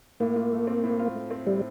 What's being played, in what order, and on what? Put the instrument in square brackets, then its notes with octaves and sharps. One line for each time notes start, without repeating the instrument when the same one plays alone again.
[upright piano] A2 [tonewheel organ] A#3
[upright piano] F4
A3
C4
A2
F4
A3
C4
[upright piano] A2 [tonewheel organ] G3